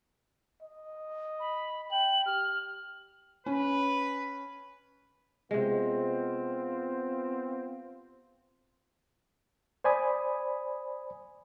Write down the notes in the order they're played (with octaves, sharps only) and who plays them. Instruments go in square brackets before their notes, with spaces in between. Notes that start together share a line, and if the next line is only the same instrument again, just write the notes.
[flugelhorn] D#5
[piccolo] B5
[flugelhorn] G5 [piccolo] F#7
[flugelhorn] G4 [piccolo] F6
[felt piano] C#4 [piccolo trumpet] B4
[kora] C3 G#3 [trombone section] B3 C4 F4
[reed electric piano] C5 D5 G#5 B5 D#6